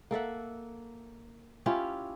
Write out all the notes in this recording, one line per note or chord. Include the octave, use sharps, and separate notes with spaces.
A#3 A4 E5 F#5
C#4 E4 F4 G4